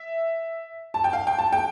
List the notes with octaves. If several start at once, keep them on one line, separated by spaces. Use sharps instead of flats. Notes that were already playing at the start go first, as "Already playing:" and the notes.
Already playing: E5
A5
G5
F5
G5
A5
G5